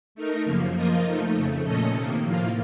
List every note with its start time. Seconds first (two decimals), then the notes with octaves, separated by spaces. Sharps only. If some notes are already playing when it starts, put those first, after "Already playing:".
0.15 A3 D#4 A#4
0.45 F#2 C#3 F3 A#3
0.75 F3 A#3 F4 A#4 D#5
1.05 F3 A3 D#4
1.34 F2 C#3 A3
1.64 A#2 A3 C#4 A4 D#5
1.93 C3 D#3 A#3
2.23 A2 F3 A#3 F4